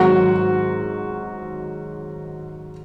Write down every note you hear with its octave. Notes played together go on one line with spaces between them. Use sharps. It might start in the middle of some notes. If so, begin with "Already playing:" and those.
Already playing: G#2 D#3 F#3 F#4